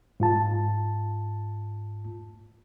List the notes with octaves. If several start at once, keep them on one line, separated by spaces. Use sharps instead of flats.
G#2 F4 A5